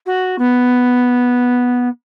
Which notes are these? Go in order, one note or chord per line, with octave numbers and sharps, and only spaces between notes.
F#4
B3